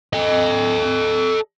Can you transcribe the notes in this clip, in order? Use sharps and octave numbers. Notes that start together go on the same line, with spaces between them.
A4 D#5